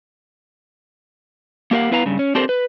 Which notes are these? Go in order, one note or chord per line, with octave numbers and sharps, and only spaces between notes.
A#3 G4 A#4 F5 F#5
B3 E4 B4 F5 A5 A#5
G2 C#3
C#4
C4 D4 G4 A4 A#4 C5
B4